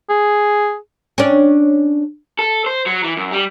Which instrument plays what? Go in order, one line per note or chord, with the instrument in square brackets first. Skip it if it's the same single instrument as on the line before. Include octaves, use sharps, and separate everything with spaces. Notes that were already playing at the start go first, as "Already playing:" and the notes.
[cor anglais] G#4
[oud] C#4 D4
[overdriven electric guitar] A4
C5
F#3
E3
F#2
G3